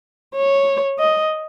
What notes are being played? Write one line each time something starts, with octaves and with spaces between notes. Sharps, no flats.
C#5
D#5